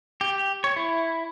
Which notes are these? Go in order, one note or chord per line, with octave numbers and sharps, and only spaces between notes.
G4
C#5
E4